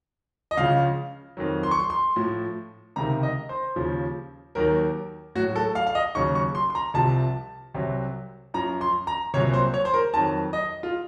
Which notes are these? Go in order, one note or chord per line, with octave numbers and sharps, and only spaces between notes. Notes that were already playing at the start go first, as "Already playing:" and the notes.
D#5
C#2 C#3 F3 F5
F2 D#3 F#3
C6
C#6
C6
C6
A2 F3
C#2 C3 D#3 A#5
D#5
C5
D#2 C#3 F3
D#2 D#3 F#3 A#4
A2 F#3 F#4
A4
F5
F5
D#5
D#2 C#3 F#3 C#6
C#6
C6
C6
A#5
C2 C3 F3 A5
C2 C3 F#3
F#2 F3 A#5
C6
A#5
C2 A#2 F#3 C#5
C5
C#5
C5
A#4
F2 D#3 F#3 A5
D#5
F4